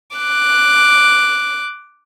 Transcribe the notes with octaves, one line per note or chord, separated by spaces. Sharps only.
D6 F#6